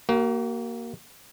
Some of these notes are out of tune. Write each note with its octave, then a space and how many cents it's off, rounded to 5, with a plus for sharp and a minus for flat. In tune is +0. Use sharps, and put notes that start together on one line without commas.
A#3 +0 F#4 +45